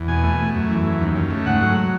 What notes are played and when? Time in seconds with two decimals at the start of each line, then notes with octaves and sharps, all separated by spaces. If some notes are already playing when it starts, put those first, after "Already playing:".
Already playing: E2
0.08 B2 G#5
0.23 A3
0.39 A3
0.55 F#2
0.69 E3
0.85 F#2
1.01 D#2
1.16 C#3
1.31 A3
1.46 G#2 F#5
1.62 F#3